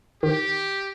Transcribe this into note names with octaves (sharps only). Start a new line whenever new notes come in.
D#3 G4